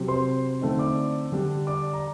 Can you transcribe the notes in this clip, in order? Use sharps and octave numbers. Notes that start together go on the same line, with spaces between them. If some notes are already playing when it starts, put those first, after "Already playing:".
Already playing: C3 F#3 C4
C5 C6
D3 A3 C4 D#4
D5 D6
D3 G3 D4
D5 D6
A#5